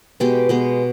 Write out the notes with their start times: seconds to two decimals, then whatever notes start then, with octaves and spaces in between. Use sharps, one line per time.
0.20 B2 G#3 B3 G4
0.49 B2 G#3 B3